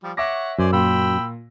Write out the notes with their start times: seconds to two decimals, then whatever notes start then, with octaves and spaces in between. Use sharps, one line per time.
0.03 F3 G3
0.17 C#5 E5 F#5 D6 A#6
0.59 F#2 C5 D5 G#5
0.73 A#2 G5 B5 E6